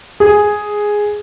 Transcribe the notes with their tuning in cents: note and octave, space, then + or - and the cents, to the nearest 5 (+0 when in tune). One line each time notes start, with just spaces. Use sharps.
G#4 +0